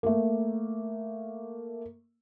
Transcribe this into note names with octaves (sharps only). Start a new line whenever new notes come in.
A3 A#3